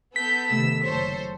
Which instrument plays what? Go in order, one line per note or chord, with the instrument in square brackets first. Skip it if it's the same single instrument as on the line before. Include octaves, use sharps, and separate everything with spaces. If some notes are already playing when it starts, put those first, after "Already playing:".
[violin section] B3 A4 G6 [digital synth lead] B6
[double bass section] C3 D#3 A3 [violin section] E6
[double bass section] F#1 [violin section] A4 C5 C#5